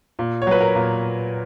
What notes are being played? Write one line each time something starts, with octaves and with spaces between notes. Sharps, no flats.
A#2
C#5
F#3 B4
A#4
A#2